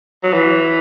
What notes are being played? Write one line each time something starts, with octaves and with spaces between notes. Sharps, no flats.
F#3
E3